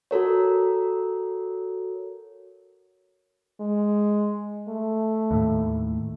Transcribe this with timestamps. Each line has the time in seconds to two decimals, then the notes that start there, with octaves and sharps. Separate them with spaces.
0.11 F#4 A4 A#4 C#5
3.60 G#3
4.69 A3
5.31 D#2 A2